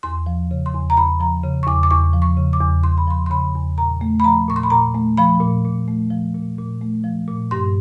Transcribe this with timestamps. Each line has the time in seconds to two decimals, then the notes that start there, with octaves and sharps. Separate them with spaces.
0.03 E2 C6
0.26 F3
0.51 C#3
0.66 C6
0.74 E2
0.90 A#5
0.97 E2 B5
1.20 F3 A#5
1.43 C#3
1.63 C#6
1.67 E2 D6
1.83 D6
1.91 E2 C#6
2.13 F3
2.22 C#6
2.37 C#3
2.53 D6
2.61 E2
2.84 E2 C6
2.98 B5
3.07 F3 C6
3.26 C6
3.30 C#3 B5
3.55 E2
3.78 A#2 A#5
4.01 A3
4.20 B5
4.24 F3 A#5
4.48 A#2 C#6
4.56 C6
4.63 B5
4.70 A#2 A#5
4.95 A3
5.17 F3 B5
5.41 A#2
5.65 A#2
5.88 A3
6.11 F3
6.35 A#2
6.58 A#2
6.81 A3
7.04 F3
7.28 A#2
7.51 G2 C6